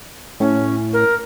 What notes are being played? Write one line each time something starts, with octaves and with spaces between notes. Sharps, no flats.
A2 C#4
A#4